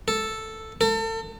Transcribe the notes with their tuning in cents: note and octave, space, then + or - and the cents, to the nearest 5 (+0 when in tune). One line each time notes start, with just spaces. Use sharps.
A4 +0
A4 +35